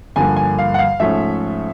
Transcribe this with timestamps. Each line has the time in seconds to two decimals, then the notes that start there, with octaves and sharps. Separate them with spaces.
0.16 G2 D3 F3 A#3 G#5
0.36 G#5
0.58 F5
0.74 F#5
0.79 F5
1.00 G#2 F3 A3 C#4 E5